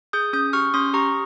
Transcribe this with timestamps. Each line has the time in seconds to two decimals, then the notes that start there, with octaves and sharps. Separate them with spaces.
0.13 G#4 D#6 G6
0.33 C#4 D#6 G6
0.53 G4 C#6 F6
0.74 C#4 C6 D#6
0.94 G4 A#5 C#6